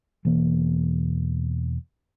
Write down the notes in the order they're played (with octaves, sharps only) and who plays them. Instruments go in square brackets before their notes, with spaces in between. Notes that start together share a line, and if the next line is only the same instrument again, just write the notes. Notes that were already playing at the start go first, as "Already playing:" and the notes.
[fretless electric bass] E1 E2 E3 A#3